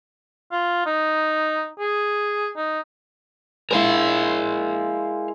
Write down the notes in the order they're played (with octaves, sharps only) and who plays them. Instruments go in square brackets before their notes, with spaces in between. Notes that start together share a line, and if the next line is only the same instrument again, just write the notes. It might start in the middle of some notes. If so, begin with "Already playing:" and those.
[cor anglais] F4
D#4
G#4
D#4
[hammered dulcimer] G#3 E4 [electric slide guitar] A#4 C5 F5